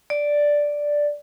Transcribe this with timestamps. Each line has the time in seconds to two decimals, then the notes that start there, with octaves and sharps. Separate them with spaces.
0.10 D5